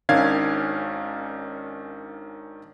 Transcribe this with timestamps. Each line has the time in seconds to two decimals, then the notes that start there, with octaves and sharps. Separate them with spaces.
0.09 G#1 D#3 C#4 D4 F5 G#6